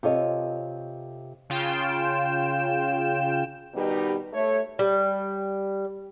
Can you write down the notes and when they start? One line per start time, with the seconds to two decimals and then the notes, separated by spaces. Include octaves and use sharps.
0.03 C3 F4 A4 C#5 D#5
1.50 C#3 F4 G5 E7
3.74 B2 D#3 G3 B3 D#4 G4
4.33 A3 C#5
4.79 G3